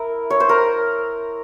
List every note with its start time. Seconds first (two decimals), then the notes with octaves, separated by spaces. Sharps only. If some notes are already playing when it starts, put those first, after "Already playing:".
Already playing: E4 A#4
0.30 C#5
0.40 C5
0.49 A#4